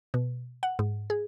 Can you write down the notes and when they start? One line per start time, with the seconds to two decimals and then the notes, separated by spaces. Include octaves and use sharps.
0.14 B2
0.63 F#5
0.79 G#2
1.10 G#4